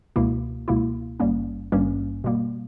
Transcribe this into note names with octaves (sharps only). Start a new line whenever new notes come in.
C#2 B2 A#3 E4
C#2 B2 A#3 E4
G#1 G2 G3 A#3 C#4
G#1 G2 G3 A#3 C#4
B2 G3 A#3